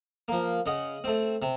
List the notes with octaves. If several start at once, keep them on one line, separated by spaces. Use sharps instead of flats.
F3 A#3
C#3 D#5 F#5
A3 C4
C3